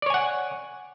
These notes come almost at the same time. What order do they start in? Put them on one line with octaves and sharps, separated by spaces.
D5 C#5 G#5 F#5